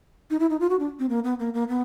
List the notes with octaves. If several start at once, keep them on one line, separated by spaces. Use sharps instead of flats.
D#4
E4
D#4
F4
F#4
D4
C4
A#3
B3
A#3
A#3
B3